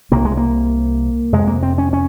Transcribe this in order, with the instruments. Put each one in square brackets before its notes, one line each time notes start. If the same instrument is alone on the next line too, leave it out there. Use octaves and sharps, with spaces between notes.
[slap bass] C2 C3 A#3
G#3
A#3
F2 C3 G#3
A#3
C4
C#4
C#4